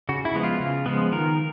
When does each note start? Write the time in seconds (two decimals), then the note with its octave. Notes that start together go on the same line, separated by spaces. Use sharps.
0.09 C#3 F#4
0.25 E4
0.35 F3 G#3 B3
0.44 F4
0.60 C#3
0.86 F3 G#3 B3
1.12 D#3 A#4